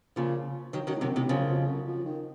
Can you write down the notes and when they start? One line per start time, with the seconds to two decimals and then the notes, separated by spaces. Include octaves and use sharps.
0.16 A#2 C#3 F3
0.73 D#3 F#3
0.87 F#2 D#3 F#3
0.96 A2
1.01 F#2 C3 D#3
1.16 A2 C3 D#3
1.29 F#2 C#3 F3
1.40 F#2
1.49 F2
1.67 F#2
1.87 F3
2.05 D#3